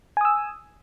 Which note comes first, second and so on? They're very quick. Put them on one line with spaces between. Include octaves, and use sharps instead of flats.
G#5 D#6 E6